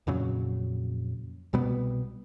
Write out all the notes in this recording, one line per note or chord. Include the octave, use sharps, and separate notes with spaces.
F2 A#2 C#3 F#3
C2 B2 G3 B3